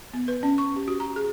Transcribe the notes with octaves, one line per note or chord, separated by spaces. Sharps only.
B3
B4
C#4
C#6
G4
F#4
A#5
G#4